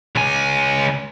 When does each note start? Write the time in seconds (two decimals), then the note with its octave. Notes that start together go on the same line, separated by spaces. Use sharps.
0.16 C#2 G#5